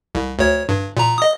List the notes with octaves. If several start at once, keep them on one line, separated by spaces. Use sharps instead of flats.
C2
D2 C#5
G2
A#2 A#5
D#5 D#6